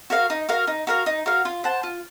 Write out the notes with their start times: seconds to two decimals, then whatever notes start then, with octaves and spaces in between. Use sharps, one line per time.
0.10 F#4 A#4 F5
0.30 D#4
0.49 F#4 A#4 F5
0.67 D#4
0.87 F#4 A#4 F5
1.06 D#4
1.26 F#4 A#4 F5
1.45 F4
1.64 C5 F#5 A5
1.83 F4